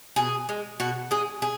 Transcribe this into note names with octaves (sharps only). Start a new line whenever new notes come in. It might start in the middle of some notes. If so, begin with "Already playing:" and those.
B2 G#4
G#3
B2 F#4
G#3 G#4
G#4